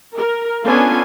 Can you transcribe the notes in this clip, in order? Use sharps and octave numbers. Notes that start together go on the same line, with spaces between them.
A#4
B3 C#4 D4 F4 A4 G#5